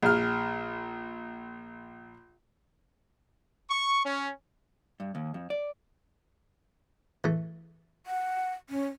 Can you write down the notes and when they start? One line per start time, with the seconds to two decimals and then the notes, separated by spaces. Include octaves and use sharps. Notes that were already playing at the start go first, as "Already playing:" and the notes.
0.02 A#1 F6
3.69 C#6
4.05 C#4
5.00 G2
5.15 D#2
5.34 F2
5.50 D5
7.24 E3 A3
8.07 F#5
8.70 C#4